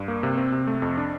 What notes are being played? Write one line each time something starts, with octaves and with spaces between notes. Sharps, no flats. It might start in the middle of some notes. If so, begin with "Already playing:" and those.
Already playing: G2
A#3
C3
C4
C3
A3
F2
D4